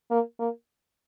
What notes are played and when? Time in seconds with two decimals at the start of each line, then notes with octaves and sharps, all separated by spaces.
0.11 A#3
0.39 A#3